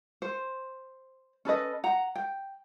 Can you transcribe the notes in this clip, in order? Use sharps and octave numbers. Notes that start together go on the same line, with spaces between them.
C5
C#4 A4 B4 D#5
F#5 A#5
G5